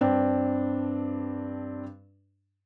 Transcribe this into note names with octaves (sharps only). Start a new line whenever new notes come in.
G2 C4 D4